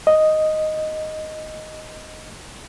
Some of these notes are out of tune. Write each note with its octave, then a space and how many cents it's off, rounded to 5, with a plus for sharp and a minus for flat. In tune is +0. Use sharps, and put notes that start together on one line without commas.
D#5 +0